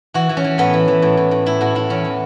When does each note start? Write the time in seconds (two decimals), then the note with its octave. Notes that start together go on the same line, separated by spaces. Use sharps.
0.14 E3 F#4
0.29 E3
0.37 C#4
0.44 E3
0.58 A2 B3
0.73 E3
0.88 E3
1.02 A2
1.17 A2
1.31 A2
1.46 A2 E4
1.61 A2 F#4
1.75 A2 E4
1.90 E2 C#4
2.04 E3